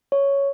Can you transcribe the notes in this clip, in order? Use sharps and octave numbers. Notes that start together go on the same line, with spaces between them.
C#5